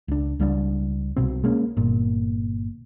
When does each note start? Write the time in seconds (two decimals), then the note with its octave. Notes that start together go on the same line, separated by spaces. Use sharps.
0.08 C#2 D4
0.39 C#2 G3 A3 D4
1.16 C2 B2 C4
1.44 G#3 A#3 C#4
1.77 G1 A#2